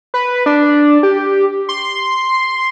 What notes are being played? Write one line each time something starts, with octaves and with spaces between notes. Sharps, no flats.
B4
D4
G4
C6